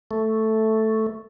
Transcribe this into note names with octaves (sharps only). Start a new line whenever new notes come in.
A3